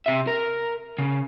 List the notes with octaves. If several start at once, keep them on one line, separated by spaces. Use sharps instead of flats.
C3 E5
A#4
C#3